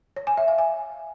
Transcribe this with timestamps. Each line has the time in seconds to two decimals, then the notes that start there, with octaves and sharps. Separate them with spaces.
0.16 C#5
0.27 G#5
0.37 E5
0.48 F5
0.58 G#5